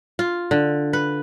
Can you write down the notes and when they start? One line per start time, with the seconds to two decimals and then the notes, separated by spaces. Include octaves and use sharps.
0.19 F4
0.51 D3
0.93 B4